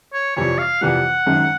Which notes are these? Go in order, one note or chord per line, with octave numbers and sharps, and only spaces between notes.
C#5
F2 C3 E3 G3 C#5
F5
F2 C3 E3 G3 F#5
F#1 F#2 D#3 G#3